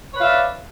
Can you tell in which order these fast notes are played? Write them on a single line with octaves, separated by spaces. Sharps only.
C#5 B4 F5 E5 D5